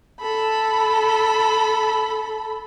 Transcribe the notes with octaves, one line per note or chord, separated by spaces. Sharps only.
A4 B5